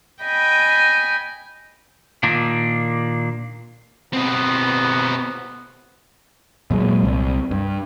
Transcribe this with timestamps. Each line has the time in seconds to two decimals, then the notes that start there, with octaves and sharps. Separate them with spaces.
0.22 D#5 G5 G#5 B5
2.23 A#2 D#3 A#3 D4
4.13 A1 B2 B3 C4
6.71 A#2 F#3 G#3
7.03 C2
7.51 G2